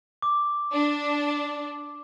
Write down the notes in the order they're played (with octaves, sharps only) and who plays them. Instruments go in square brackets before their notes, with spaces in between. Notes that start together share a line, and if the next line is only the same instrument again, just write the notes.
[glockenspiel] D6
[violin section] D4